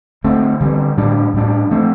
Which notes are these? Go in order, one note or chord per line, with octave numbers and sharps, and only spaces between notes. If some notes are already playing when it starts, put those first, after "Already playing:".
D3 A3 C4
D3 G3 C4
A2 G3 D4
A2 G3 D4
F3 A3 C4